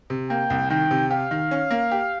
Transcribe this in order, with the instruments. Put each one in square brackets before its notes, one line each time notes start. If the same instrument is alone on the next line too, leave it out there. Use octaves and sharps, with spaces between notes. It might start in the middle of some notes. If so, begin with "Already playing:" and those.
[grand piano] C3
[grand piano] A#3 [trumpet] G5
[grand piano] C2
[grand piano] D#3 [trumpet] G5
[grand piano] C3
[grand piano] G4 [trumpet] F5
[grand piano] D#3
C#4
A#3
G4